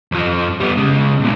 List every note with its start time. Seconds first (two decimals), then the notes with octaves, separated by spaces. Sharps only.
0.12 F2 F3
0.60 G3 B3
0.77 C#3 G#3
1.20 B1 A#2